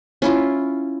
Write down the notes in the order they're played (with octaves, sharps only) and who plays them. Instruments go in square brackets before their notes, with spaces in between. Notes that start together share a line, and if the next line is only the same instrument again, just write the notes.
[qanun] C#4 E4 F4